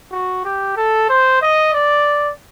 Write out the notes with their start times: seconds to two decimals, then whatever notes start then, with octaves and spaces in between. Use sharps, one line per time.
0.12 F#4
0.45 G4
0.77 A4
1.09 C5
1.42 D#5
1.74 D5